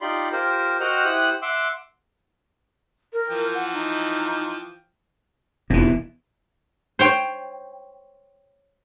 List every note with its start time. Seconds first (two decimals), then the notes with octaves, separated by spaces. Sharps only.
0.01 D#4 F4 G4 D5 B5 C6
0.32 F4 G4 A#4 C5
0.80 F#4 C5 D#5 F#5 G5 F6
1.05 E4 G4 C5 F#5 D#6 F#6
1.42 E5 F#5 C6 D6 E6
3.13 A#4
3.29 E3 F3 G5
3.54 F#5
3.73 D#4
5.70 F1 B2 E3
6.99 C5 C#5 G5